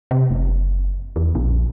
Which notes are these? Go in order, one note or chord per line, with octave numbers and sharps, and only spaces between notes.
C3
F#1
E2
A#1